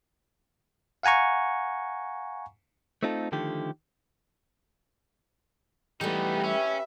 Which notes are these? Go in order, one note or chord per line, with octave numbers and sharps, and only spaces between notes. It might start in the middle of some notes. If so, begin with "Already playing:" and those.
F5 F#5 G#5 A#5 C#6
A3 C4 D#4 F4 A4
D3 D#3 F3 A3 G4
E3 G3 A3 B3 D#4 G4 B4
C#4 E5